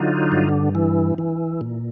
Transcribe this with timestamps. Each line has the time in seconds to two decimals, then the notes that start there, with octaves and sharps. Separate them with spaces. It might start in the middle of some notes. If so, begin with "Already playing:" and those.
Already playing: D3 F#3 D#4 F4
0.32 G2
0.75 E3
1.18 E3
1.61 A#2